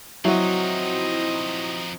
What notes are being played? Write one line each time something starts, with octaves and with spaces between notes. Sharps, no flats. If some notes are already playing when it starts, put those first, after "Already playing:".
F3 F#3 C4 D#4 E4 F#4 D#5